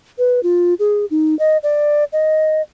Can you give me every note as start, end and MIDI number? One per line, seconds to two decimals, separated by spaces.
0.18 0.40 71
0.43 0.74 65
0.79 1.05 68
1.11 1.37 63
1.39 1.57 75
1.63 2.04 74
2.13 2.62 75